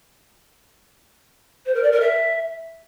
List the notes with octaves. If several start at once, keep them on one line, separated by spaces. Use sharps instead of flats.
C5
A#4
D5
A#4
E5